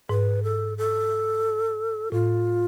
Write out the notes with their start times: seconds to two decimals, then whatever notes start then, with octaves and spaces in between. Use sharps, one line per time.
0.09 G#2 B4
0.43 A4
0.78 A4
2.12 A2 F4